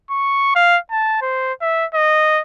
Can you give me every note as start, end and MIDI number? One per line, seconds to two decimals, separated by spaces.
0.10 0.55 85
0.55 0.78 77
0.91 1.19 81
1.22 1.53 72
1.61 1.85 76
1.94 2.42 75